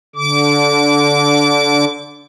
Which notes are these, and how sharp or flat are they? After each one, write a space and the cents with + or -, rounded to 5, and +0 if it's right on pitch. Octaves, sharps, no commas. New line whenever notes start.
D3 -20 D6 -25